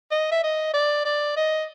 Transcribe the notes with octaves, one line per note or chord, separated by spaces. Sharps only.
D#5
E5
D#5
D5
D5
D#5